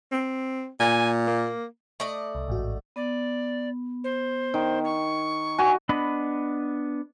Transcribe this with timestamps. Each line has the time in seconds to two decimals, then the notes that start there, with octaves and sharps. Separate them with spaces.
0.12 C4
0.80 A#2 G#5
1.27 A#3
2.00 A3 D5 D#5
2.35 C2
2.48 A1 G#2 F#4
2.96 B3 D5
4.04 C5
4.54 D#3
4.84 C#6
5.58 F#4 G#5
5.89 B3 D4 D#5 B5